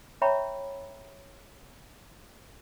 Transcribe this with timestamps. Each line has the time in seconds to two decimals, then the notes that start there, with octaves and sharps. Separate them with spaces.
0.22 C#5 E5 G5 A#5 B5 C#6